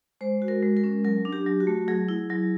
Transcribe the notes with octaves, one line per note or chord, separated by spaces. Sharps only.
G#3 C5
F#4
A#4
G#3
A#4
C#4
F#3 A#4
D4
G4
F#3
F#4
A3
F#3 G#4
E4
F#3